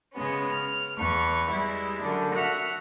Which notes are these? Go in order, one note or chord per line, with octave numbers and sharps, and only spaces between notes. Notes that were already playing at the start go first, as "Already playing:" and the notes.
C#3 G#3 B3 C#4
F6
E2 B4 C#6
G3 G#3 E4
F#2 D3 D4
F#4 E5 F#5 F6